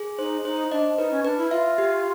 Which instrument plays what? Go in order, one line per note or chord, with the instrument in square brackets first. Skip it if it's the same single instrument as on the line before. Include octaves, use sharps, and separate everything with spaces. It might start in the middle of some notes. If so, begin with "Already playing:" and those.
Already playing: [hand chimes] G#4
[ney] D#4 [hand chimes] C5
[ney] D#4 [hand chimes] C5
[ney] D4 [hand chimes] D#5
[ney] D#4 [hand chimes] B4
[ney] C#4
[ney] D4 [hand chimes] B4
[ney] E4
[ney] F4 [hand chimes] E5
[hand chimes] G4